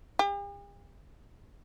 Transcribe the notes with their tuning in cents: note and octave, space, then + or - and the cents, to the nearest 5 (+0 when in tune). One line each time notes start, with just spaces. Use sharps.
G4 +45